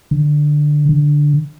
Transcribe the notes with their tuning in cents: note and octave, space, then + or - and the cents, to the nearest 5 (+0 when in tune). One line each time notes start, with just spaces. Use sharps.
D3 +10
D3 +0